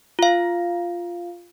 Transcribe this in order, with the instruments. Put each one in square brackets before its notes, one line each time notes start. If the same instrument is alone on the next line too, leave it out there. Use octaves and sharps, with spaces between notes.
[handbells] F4 F5